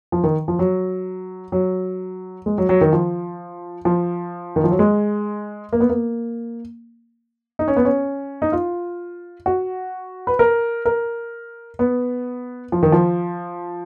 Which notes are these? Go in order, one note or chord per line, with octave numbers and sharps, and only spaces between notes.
F3
D#3
F3
F#3
F#3
G#3
F#3
F#3
D#3
F3
F3
D#3
F3
F#3
G#3
A#3
B3
A#3
D#4
C#4
B3
C#4
D#4
F4
F#4
B4
A#4
A#4
B3
F3
D#3
F3